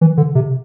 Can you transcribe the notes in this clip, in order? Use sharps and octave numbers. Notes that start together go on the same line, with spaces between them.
E3
D3
C3